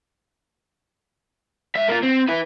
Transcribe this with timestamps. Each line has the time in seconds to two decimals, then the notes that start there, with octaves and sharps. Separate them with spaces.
1.75 G#2 E5
1.88 A#3 F4
2.03 C4
2.28 E4 B4